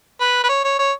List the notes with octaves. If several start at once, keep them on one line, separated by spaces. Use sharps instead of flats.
B4
B4
C#5
C#5
C#5